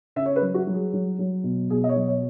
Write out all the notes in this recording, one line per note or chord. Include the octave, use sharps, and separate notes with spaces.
C#3 E5
C#5
B4
F#3
F#4
F#3
G#4
F#3
F#3
B2
B2 G#4
D#5
C#5
F#3
C#5